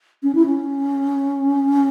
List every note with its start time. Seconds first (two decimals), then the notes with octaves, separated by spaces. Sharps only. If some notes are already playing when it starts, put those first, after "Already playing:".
0.23 C#4
0.35 E4
0.46 C#4